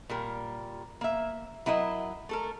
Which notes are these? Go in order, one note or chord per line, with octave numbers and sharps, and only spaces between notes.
A#2 G3 A#4
A#3 E5
F#3 E4 A#4 D#5
A3 A4 A#4